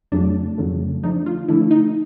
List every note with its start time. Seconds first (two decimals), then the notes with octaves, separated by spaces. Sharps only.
0.12 F2 C#3 F#3 A3 D4
0.58 F2 C#3 F#3 A3
1.03 D3 F3 A3 D4 D#4
1.26 F4
1.48 D3 F3 A3 D4 E4
1.71 D#4